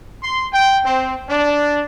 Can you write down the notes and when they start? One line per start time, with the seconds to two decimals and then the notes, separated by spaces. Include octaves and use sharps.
0.23 C6
0.52 G5
0.85 C4
1.28 D4